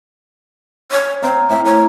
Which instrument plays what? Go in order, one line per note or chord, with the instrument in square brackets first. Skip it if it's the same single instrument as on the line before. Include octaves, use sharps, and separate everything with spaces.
[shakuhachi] C#5
[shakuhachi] C4 [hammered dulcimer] F5 A#5
[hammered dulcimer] A2 C4 [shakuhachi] E5
[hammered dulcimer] A#4 [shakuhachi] C#5